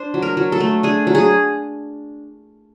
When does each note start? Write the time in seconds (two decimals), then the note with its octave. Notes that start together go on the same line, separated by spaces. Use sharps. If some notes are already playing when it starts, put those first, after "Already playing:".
Already playing: D4 C5
0.14 F#3
0.22 A#4
0.37 F#3
0.52 A4
0.60 A3
0.83 D4 G#4
1.07 F#3
1.15 G#4